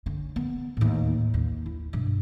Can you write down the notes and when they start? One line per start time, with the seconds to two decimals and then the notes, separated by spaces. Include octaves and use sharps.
0.06 D3 C#4
0.36 B3
0.77 D#2 A2
1.34 D#2
1.66 E4
1.93 G2 B2